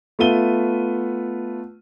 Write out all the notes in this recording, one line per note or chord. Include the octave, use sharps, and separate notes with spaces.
A3 B3 F4 D#7 G7